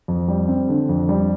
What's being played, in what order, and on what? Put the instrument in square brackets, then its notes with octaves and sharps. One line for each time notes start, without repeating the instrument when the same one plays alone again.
[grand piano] F2
G3
C4
D3
F2
G3